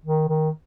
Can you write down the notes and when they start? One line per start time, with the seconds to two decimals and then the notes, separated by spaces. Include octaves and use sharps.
0.05 D#3
0.29 D#3